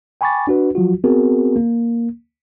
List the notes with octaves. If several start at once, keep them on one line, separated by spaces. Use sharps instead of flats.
G5 G#5 B5 C#6 D6 A6
D4 F#4 B4
F3 F#3 F4 F#4
B3 C4 F#4 G#4 A#4
A#3